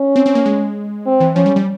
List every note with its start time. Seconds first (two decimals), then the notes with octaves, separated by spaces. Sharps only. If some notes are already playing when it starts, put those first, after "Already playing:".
Already playing: C#4
0.16 C4
0.26 C4
0.35 A#3
0.46 G#3
1.06 C4
1.20 E3
1.36 F3 C#4
1.46 G3
1.56 G3